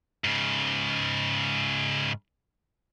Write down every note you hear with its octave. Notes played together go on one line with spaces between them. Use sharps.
G#2 C#3